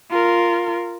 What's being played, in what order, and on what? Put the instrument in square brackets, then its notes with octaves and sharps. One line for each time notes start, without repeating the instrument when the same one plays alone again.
[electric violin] F4 A#4